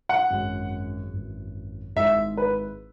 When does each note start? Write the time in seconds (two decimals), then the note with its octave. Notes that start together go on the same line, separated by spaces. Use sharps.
0.09 F#5
0.30 G#1 F#2 E3 G#3
1.13 G#1 F#2 E3
1.96 G#1 G#2 G#3 E4 G#4 E5
2.37 B4